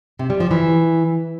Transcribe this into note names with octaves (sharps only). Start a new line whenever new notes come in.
C3
G3
F3
E3